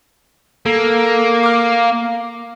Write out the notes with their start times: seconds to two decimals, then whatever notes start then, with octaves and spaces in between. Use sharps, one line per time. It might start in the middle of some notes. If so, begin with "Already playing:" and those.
0.66 A#3 A4
1.43 D6 F6